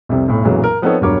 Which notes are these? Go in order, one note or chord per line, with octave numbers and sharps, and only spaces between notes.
C2 F2 C3
B1 A2
B1 F#2 A#2 E3 F#3 G#3
A#4
F3 B3 C4 D#4 A4 C#5
E1 G2 F#3 A#4 C#5 D6